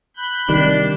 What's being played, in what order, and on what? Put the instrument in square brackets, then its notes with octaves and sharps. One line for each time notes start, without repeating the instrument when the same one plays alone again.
[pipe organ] B5 F#6 G6
[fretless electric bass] C3 D#3 G3 [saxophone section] D4